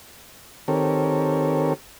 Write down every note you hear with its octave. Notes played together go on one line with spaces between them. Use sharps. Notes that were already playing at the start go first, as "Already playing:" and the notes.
D#3 C4 G4 A4 A#4 C#5